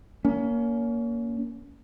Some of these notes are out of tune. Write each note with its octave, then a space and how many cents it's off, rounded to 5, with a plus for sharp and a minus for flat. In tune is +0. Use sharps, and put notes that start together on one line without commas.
A#3 +0 C#4 +30